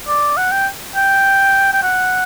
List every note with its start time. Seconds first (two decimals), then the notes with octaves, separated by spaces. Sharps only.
0.08 D5
0.37 F#5
0.52 G5
0.95 G5
1.73 G5
1.83 F#5